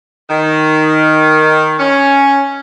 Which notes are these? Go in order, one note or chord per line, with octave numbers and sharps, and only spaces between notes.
D#3
C#4